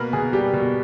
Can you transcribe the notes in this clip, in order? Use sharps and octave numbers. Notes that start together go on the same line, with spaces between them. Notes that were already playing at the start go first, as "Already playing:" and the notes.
Already playing: B2 A#3 A#4 B4
B2 G#4
G3 G4
B2